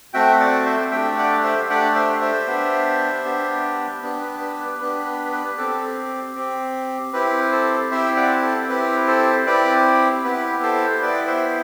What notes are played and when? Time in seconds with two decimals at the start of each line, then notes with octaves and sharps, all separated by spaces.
0.13 A3 C4 F#4 E5 G5
0.40 D5 F#5
0.65 C5 E5
0.92 A3 D4 G4 E5 G5
1.18 D5 F#5
1.43 C5 E5
1.69 A3 D4 G4 D5 F#5
1.95 C5 E5
2.21 C5 E5
2.47 B3 D4 G4
3.25 B3 D4 G4
4.03 B3 D4 G4
4.21 B4
4.41 B4
4.60 B4
4.80 B3 D4 G4 B4
5.06 B4
5.32 B4
5.58 C4 G4 A4
6.36 C4 G4
7.13 C4 E4 G4 B4
7.52 A4 C5
7.91 C4 E4 G4 C5 E5
8.16 D5 F#5
8.42 A4
8.69 C4 E4 G4 B4
9.07 A4 C5
9.46 C4 E4 G4 B4 D5
10.24 B3 E4 G4 B4
10.63 A4 C5
10.91 C5
11.01 B3 E4 G4 B4 D5
11.28 C5 E5